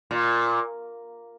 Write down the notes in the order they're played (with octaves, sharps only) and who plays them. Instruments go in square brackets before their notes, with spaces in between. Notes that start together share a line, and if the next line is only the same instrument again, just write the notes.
[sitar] A#2